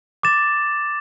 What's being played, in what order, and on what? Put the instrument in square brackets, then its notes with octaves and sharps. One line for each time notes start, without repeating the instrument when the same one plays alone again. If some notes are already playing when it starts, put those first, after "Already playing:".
[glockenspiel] D6 A6 E7